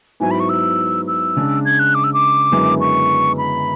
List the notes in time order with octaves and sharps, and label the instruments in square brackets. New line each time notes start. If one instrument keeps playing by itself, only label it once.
[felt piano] G#2 F#3 B3 E4 [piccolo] G#5
[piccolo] B5
C#6
E6
E6
[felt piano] C#3 G#3 D4
[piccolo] G#6
F#6
D6
E6
D6
[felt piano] F#2 D3 G#3 B3 E4
[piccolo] C#6
B5